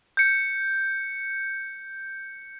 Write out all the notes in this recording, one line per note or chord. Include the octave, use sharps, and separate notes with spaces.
G6 C#7